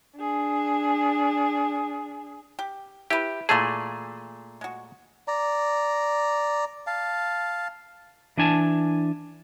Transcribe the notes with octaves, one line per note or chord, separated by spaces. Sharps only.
D4 G#4
G4
E4 G4 B4
A#2 E3 A3 G#4 A5
G#3 F#4
D5 A#5
F5 A5
E3 D4 G#5 A5